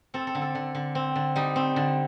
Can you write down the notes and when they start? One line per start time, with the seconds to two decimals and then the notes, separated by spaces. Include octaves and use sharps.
0.14 C4 A4
0.27 A4
0.35 D3
0.42 A4
0.55 D3
0.75 D3
0.95 C4
1.15 D3
1.36 G3 D#4
1.56 C4
1.76 D3